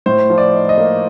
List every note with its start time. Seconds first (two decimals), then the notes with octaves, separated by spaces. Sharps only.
0.06 A2 C5
0.30 F3
0.38 D5
0.53 D#4
0.69 D#5
0.77 A#3